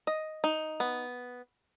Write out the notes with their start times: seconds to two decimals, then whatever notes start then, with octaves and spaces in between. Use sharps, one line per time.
0.07 D#5
0.44 D#4
0.80 B3